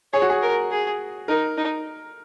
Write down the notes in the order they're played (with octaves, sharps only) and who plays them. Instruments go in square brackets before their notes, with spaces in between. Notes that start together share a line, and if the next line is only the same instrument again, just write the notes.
[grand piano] G#4 [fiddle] C#5
[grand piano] F#4
G#4
[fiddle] A#4
G#4
[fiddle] D#4 [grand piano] A#4
[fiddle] D#4